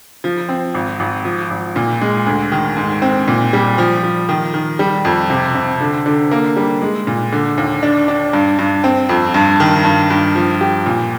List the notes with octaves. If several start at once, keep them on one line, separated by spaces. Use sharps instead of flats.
F3
C4
G#1
G#1
F3
G#1
A#2
G#3
D2
D#3
G#2
C4
A#2
G3
F3
F3
D#3
D#3
G3
F2
C3
C3
D3
D3
A#3
G3
G#3
A#2
D3
D#2
D4
D4
G2
G2
C4
F2
G2
D#3
G2
G2
F3
G4
A#2